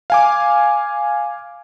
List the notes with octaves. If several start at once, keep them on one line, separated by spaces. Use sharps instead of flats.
F5 G#5 D6